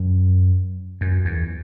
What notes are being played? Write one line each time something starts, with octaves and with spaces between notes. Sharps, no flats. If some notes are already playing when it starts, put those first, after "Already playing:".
Already playing: F#2
F#2
E2